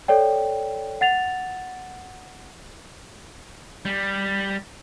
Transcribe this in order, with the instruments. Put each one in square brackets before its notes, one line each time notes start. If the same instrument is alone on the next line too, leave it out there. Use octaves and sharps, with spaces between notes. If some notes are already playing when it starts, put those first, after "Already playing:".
[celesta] A4 C#5 D5 G5
F#5 A6 F7
[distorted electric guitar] G3